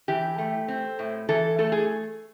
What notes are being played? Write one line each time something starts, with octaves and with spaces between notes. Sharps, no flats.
E3 G4
A3
C4
A2
E3 A4
A3 A4
G#4